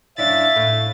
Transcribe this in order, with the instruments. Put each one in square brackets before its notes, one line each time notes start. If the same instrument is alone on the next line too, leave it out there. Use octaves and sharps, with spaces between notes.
[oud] F#2 D4 E4 [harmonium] C#5 F5 [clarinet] E5 [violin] A6
[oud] A2